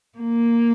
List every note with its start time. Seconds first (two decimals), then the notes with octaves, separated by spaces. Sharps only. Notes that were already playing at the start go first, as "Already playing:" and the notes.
0.18 A#3